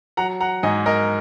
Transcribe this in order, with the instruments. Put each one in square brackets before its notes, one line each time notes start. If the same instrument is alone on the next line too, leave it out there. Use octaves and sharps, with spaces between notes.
[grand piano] F#3 F#5 A#5
F#5 A#5
G#2 D#5 G#5
A#4 D#5